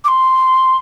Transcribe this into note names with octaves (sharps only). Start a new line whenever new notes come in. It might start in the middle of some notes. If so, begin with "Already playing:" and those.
D6
C6